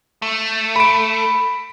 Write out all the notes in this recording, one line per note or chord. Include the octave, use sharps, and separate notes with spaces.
A3
B5 D7